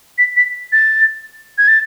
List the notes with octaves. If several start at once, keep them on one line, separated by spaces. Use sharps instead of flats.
B6
B6
A6
G#6
A6